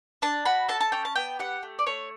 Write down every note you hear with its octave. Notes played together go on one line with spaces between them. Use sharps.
D4 A5
F#4 B5
A4 A5
A5
C#4 G5
A5
B3 G5
G4 F#5
A3
D5
A3 C#5